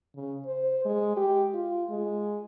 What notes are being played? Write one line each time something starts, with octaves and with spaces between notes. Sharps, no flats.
C#3
C5
G#3
G4
F4
G#3